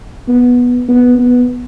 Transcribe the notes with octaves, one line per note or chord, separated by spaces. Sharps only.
B3
B3
B3